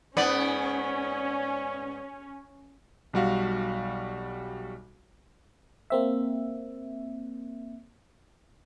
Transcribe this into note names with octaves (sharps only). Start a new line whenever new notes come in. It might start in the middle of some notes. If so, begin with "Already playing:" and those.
G#2 B3 C#4 D5
B1 G3 F#4 F5
A#3 C4 E5